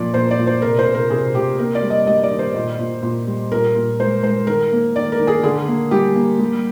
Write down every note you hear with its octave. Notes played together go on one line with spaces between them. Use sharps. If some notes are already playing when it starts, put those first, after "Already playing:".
Already playing: A#2 F3 A#3 D5
A#2 C5
D5
A#2
C5
C3 A#4
C5
C3
A#4
C3 G#4
C3 G4
A#3 A#4
D5
G3
D#5
G3 D#5
D5
D#3
C5
A#2
A#2
A#2
G3
A#2 A#4
A#2
G#3 C5
G#3 C5
D#3 A#4
A#3
D#3 D5
A#4
D#3
G#4
D3 G#4
A#3
G3 G4
A#3
G3